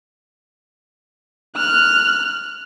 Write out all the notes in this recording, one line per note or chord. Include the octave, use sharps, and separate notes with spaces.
F6 F#6